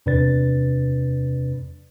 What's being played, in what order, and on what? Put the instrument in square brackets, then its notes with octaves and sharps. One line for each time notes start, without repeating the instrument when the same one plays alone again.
[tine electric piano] E2 C3 D4 B4 D5 A6